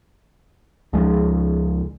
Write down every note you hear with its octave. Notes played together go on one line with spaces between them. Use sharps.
C#2 F3 G#3